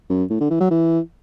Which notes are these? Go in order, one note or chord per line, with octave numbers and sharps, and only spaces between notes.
F#2
A2
D3
E3
F#3
E3